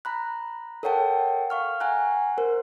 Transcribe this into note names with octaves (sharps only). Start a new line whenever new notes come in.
A#5 B5 F#6
A4 A#4 C#5 F#5 G5 A5
F5 C#6 F6
F#5 G#5 A#5 F#6
A#4 C5